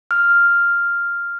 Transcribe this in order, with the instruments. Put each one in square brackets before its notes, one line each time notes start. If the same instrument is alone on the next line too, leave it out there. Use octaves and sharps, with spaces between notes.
[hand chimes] F6